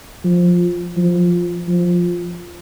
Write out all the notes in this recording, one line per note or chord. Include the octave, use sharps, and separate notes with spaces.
F3
F3
F3